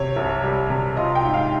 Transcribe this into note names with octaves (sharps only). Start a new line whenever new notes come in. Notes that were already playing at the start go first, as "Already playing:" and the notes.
Already playing: C3 C#5
C2
G3
C3
F4 D#5
G5
G#2
F5